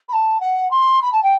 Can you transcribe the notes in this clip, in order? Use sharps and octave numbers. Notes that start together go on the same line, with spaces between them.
B5
A5
F#5
C6
B5
A5
G5